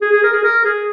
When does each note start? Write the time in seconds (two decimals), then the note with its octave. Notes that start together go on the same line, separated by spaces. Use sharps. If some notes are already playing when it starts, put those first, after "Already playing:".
0.02 G#4
0.12 G#4
0.23 A#4
0.33 G#4
0.44 A#4
0.65 G#4